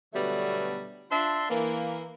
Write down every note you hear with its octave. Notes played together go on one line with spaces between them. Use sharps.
B2 D3 F#3 G3 A3 B3
D4 F4 E5 A5 C6
E3 A#3